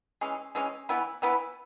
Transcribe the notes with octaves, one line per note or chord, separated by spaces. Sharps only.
E3 G#3 C#4
E3 G#3 C#4
E3 B3 E4 B4
E3 B3 E4 B4